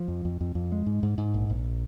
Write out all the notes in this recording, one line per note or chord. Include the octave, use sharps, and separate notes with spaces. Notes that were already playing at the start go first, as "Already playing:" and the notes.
Already playing: F3
F2
F2
F2
F2
G#3
G#2
G#2
G#2
A#1
A#1